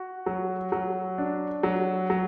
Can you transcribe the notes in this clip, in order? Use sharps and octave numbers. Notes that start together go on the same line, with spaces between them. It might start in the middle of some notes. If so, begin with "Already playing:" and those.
Already playing: F#4
F#3
F#3
D4
F#3
F#3